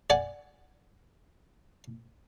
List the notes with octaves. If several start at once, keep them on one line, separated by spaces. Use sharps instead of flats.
D5 F#5 G#5